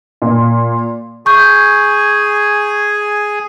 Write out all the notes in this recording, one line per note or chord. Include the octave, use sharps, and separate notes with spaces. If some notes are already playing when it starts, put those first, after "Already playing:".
A#2
G#4 G#5 C#6 G6